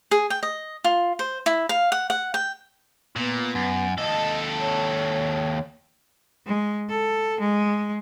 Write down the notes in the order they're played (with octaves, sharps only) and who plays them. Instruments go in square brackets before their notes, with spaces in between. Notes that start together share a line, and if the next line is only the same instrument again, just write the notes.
[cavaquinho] G#4
G5
D#5
F4
C5
E4
F5
F#5
F#5
G5
[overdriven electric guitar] A#2 [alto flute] B3
[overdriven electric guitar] F#2
[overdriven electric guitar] D#2 A4 [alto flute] D#5
[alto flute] C#5
[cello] G#3
A4
G#3